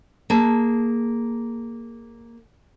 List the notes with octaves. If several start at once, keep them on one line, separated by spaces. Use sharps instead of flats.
A#3 G#4 A5